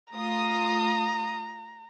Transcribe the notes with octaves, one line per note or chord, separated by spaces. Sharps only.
A3 F4 A#5 D#6